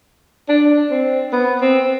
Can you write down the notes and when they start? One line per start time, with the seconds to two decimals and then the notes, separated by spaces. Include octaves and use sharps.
0.49 D4
0.91 C4
1.32 B3
1.61 C4